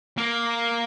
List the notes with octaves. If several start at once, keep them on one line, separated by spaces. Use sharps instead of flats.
A#3